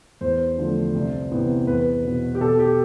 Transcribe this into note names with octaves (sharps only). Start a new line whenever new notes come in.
E2 C5
D3 F3 A3
C2
C3 E3 B3
E2 B4
B2 B3
G4
B2 A4
G4